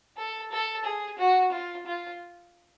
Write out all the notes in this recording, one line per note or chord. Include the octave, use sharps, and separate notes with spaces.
A4
A4
G#4
F#4
F4
F4